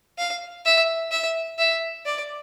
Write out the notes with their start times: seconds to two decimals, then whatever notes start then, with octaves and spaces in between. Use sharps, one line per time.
0.18 F5
0.65 E5
1.11 E5
1.58 E5
2.06 D5